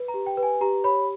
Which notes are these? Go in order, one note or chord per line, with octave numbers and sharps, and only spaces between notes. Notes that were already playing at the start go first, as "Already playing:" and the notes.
Already playing: B4
A#5
G4
G5
B4
G#5
G4 A#5
C#5 B5